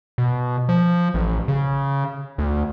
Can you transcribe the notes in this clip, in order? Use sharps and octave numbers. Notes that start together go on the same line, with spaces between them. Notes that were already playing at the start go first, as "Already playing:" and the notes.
B2
F3
A1
C#3
D2